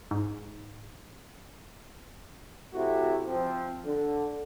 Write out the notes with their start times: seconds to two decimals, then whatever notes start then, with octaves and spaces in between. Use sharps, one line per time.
0.11 G#2
2.74 C3 A3 E4 F#4
3.27 F3 C4
3.85 D3